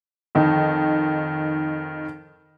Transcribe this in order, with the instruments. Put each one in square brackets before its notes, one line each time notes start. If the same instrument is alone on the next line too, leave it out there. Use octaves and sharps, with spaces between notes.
[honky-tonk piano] F2 D#3